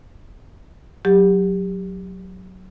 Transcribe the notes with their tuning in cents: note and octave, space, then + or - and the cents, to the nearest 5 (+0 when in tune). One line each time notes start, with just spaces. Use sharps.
F#3 +0 G4 +20